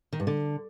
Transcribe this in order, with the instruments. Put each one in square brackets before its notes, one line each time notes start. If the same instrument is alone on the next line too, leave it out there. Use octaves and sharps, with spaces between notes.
[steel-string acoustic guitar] D#3
G2
D3